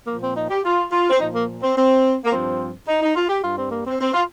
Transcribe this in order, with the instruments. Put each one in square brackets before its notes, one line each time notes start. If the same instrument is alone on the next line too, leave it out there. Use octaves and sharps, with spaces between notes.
[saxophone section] A#2 F3 A#3
C4
D#4
G4
F4
F4
C4
A#2 F3 D#4
A#3
C4
C4
A#3
G2 F3 C4
D#4
D#4
F4
G4
G2 G3 F4
C4
A#3
C4
C4
F4